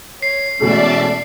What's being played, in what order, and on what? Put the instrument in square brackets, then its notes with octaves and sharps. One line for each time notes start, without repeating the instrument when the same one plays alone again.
[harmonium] C#5 [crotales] C7
[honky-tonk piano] B2 A3 [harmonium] E3 G#3 C#4 [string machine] D5 E5 A5